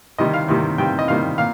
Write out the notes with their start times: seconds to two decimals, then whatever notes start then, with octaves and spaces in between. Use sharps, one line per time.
0.18 C3 D#3 G3 D#5
0.34 F5
0.48 C3 D#3 G3
0.78 C3 D#3 G3 G5
0.99 D#5
1.08 C3 D#3 G3 F5
1.38 A#2 F5